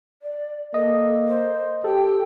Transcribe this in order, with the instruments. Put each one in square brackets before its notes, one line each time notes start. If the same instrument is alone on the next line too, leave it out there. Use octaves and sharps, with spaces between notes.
[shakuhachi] D5
[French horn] A#3 [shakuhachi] A4 [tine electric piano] D#5
[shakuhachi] C5
[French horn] G4 [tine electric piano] A4 [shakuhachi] G5